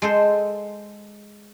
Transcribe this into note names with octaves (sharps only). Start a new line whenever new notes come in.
G#3 A4 C5